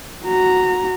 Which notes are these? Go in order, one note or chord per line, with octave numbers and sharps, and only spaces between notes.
F#4 A#5